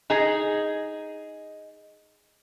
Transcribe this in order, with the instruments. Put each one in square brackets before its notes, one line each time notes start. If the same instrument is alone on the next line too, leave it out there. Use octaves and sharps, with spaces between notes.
[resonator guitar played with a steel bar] D#4 G#4